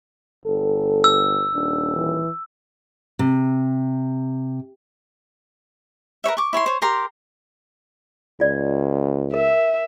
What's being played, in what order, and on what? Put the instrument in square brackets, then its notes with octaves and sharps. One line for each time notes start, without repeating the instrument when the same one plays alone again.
[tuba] G1 [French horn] A4
[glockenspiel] E6
[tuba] D#1 [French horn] D4
[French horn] E3
[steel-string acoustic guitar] C3
[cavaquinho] A#4 B4 C#5 E5
C#6 D6
E4 C#5 A5 C6
C5 C#5
G4 A#4 A#5 C6
[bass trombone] C#2 [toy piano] F4 D5
[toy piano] A#4 [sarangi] E5